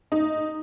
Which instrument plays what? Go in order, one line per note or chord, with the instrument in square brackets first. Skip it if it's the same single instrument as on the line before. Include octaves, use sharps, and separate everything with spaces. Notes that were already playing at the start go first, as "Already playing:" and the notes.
[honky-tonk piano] D#4